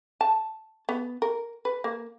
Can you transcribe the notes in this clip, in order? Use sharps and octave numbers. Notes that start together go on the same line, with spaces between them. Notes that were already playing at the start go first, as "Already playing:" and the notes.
A5
B3
A#4
B4
A#3